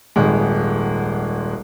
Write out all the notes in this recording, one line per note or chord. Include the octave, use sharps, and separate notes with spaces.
D#1 G#1 G#3